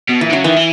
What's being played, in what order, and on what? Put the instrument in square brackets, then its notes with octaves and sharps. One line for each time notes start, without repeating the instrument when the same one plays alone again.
[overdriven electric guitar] B2
[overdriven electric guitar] A#2 [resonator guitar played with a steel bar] E3
[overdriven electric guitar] D#3
[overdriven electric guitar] C#3 [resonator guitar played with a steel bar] F#3
[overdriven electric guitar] D#3 [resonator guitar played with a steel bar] E3
[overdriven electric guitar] E3